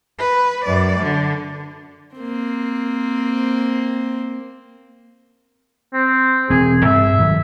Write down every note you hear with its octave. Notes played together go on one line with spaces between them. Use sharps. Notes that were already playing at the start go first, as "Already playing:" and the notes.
B4
F#2 D5
D3
A#3 C4
C4
E1 C4 G#4
G2 C4 E5
G#2 D#3 F#3